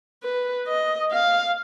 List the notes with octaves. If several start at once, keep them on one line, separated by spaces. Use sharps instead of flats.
B4
D#5
F5